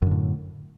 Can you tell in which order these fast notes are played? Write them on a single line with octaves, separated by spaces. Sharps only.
F#2 D3 A2